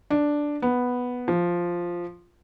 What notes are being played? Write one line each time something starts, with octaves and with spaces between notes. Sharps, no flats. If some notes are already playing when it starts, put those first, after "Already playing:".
D4
B3
F3